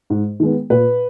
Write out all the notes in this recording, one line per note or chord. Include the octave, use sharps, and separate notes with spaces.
G#2
D#3 G#3 B3
A#2 B4